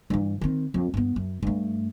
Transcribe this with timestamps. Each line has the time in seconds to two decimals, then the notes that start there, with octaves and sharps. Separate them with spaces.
0.10 G2 E3
0.41 D#3 C4
0.74 F2
0.94 G2 B3
1.16 F#2
1.43 G2 A3